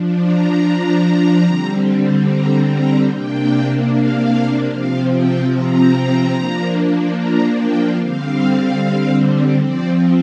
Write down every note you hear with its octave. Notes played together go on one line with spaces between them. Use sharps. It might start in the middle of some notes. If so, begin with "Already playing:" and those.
Already playing: F3 D4
A#5
D3 G3 C4
A#5
A#5
C3 A#3 D4 G5
F5
C3 F3 C4 F5
G5
A#5
F3 A#3 D4
A#5
G5
D3 G3 C4 F5
F3 C4 D5